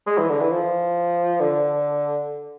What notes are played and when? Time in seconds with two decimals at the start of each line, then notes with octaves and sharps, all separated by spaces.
0.07 G#3
0.18 E3
0.29 D3
0.41 E3
0.52 F3
1.40 D3